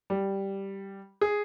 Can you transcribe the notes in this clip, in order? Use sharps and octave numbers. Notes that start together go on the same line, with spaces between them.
G3
G#4